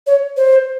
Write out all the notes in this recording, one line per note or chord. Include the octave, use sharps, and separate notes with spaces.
C#5
C5